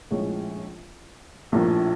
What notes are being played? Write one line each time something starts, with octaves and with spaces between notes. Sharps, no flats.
A#1 A2 F3 G#3 C#4
A#1 A2 F3 A#3 D4